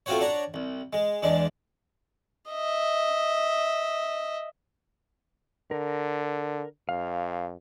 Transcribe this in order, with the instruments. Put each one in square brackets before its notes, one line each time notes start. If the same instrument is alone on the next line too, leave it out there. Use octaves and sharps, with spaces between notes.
[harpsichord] A3 C4 F4 F#4 C5 C#5
D4 C#5 F#5 A#5
C2
G#3
E2 G#3 D4
[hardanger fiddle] D#5 E5
[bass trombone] D3 [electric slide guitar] A#4
[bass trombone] F2 [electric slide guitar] F5